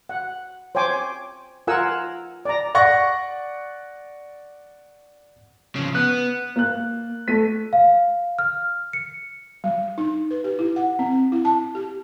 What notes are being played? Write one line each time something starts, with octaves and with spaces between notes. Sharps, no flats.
F#5
C5 C#5 G5 G#5 D6
F4 A#4 F#5 G#5 E6
D5 A#5
D5 F#5 C#6 A#6
C#3 F3
B3 F#6
A#3 F#6
A3 B6 D#7
F5
F6
C#7
G3
D#4
B4
G4
E4
F#5
C4
E4
A5
G4